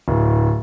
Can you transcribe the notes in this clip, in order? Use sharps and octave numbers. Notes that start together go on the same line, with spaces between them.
D1